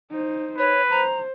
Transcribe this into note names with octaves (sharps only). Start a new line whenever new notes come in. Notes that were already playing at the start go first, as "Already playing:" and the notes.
D#4 C5
B4 C#5
C5 A#5